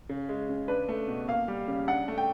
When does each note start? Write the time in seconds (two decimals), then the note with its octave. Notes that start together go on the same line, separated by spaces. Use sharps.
0.09 C#3
0.29 G#3
0.49 C#3
0.68 D4 B4
0.89 A3
1.08 B2
1.28 A#3 F5
1.48 G3
1.68 C#3
1.88 D4 F#5
2.08 A3
2.18 G5